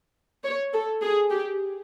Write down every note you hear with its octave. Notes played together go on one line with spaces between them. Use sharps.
C#5
A4
G#4
G4